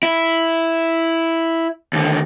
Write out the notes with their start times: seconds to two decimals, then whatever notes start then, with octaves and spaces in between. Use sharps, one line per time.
0.03 E4
1.93 D#2 D3